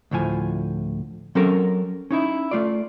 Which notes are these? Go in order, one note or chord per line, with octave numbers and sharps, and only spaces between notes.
D2 A2 F3 G#5
F#3 C4 C#4 A4 A#4
C#4 D#4 E4
A3 F4 D5